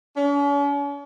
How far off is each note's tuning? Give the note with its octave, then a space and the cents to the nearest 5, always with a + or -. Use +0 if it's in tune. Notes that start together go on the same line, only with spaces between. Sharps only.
C#4 +45